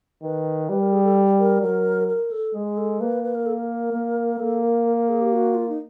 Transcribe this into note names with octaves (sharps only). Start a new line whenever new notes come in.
D#3 B4
G3 B4
A#4
G#4
A4
A#4
F#3 A#4
A#4
A4
G#3 G#4
A4
A#3 B4
B4
A#4
A4
A#4
A#3
A#3 A4
A#4
A#4
A#4
G#4
G4
F#4
F4
D#4